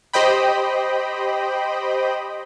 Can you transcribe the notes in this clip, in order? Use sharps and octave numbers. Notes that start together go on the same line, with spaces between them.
G4 C5 D#5 G5 B5